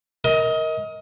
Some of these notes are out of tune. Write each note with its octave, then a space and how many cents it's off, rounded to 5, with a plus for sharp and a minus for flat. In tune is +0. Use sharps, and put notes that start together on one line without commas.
A#4 +0 D#5 +25